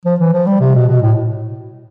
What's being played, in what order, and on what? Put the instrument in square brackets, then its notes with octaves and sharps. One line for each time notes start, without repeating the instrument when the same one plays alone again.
[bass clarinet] F3
E3
F3
G3
C3
B2
B2
A2